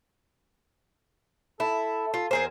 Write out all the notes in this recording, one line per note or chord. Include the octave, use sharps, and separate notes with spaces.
E4 A4
F4
E2 C4 G#4 A#4 C5